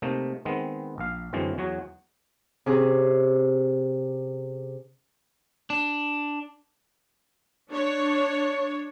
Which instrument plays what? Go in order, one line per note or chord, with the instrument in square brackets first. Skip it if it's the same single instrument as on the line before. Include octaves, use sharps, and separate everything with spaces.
[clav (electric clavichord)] C3 A3 A#3 D#4
D#3 G#3 B3 C4
A#1 F5
F#2 D3 E3 G#3 C4
E2 F#3 F#4 G#4
[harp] C3 C#4 G#4
[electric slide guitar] D4
[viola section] D4 C#5